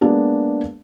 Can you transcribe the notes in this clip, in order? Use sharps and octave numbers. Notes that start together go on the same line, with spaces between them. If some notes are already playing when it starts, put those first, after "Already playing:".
G#3 A#3 B3 D4 G#4